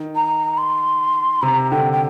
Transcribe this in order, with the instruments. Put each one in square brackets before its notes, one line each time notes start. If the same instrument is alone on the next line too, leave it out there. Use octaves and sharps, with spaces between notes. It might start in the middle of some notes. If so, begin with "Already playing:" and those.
Already playing: [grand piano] D#3
[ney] A#5
C6
[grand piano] C3 [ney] A#5
[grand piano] D3 [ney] G5
[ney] G5